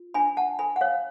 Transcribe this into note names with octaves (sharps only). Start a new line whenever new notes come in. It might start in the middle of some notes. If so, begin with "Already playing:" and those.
Already playing: F4
D4 G#5 B5
F#5 A5
A4 G#5 B5
F#5
C#5 F5